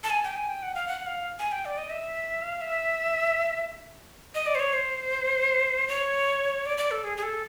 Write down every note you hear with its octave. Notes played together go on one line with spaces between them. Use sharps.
A5
G#5
G5
G#5
G5
F#5
F5
F#5
F5
G#5
G5
D5
D#5
E5
F5
E5
D#5
D5
C5
C#5
C5
C#5
D5
D5
A4
G#4
G#4
A4